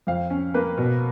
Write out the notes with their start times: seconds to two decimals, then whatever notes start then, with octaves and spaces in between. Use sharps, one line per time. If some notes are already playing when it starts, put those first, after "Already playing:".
0.07 F2 F5
0.30 C#4
0.54 A#3 B4
0.78 B2